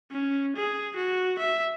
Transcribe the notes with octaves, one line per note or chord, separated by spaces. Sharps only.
C#4
G#4
F#4
E5